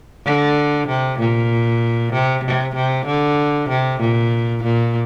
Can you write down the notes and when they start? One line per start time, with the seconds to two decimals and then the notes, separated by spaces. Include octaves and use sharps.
0.25 D3
0.88 C3
1.19 A#2
2.13 C3
2.44 C3
2.75 C3
3.06 D3
3.69 C3
4.00 A#2
4.63 A#2